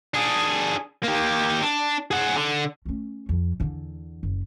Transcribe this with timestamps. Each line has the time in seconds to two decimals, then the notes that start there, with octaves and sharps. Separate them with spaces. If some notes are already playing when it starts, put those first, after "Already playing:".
0.14 D4 G#4
1.03 A#3 G4
1.62 D4
2.11 G#4 F#5
2.36 D3
2.85 A3 C#4
3.29 F2
3.60 E2 D3
4.23 F#1